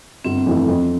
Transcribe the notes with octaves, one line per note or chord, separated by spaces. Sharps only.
G1 C4
F2 E3 A3
F2